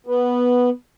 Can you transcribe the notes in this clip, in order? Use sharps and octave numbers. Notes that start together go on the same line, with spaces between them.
B3